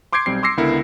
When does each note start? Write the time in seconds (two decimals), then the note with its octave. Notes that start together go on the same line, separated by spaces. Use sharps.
0.13 C6 D6 G6 G#6 C7 D7
0.26 B1 G3 C4 C7
0.43 C6 D6 E6 A#6 C7 C#7
0.57 C#2 D3 B3 E4 A#4